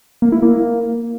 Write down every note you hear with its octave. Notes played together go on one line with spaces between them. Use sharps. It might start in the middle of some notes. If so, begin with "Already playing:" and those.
A#3
E4
A#3